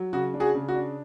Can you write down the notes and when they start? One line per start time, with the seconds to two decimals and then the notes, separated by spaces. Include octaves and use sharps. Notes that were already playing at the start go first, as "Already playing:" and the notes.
Already playing: F#3
0.13 C#3 F#4
0.34 D4
0.40 F#4 G#4
0.55 C#3
0.68 F#4
0.75 D4